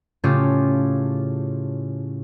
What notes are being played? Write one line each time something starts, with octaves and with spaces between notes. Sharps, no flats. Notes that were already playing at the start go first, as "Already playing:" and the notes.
A2 C#3 A3 C#4 F4 G4